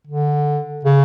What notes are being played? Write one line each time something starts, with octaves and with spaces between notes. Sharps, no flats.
D3
C#3